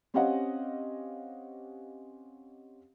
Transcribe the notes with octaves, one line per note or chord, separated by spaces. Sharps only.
C4 C#4 G4 D#5 F5 F#5